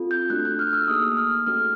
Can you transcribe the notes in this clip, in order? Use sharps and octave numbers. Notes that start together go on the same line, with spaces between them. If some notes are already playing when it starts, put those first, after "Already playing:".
Already playing: C4 F4 A4
G6
A3 D4 F#4 A4 F#6
F#6
F6
E6
A#3 D#4 G#4 D#6
F6
A3 C#4 F#4 A4 F6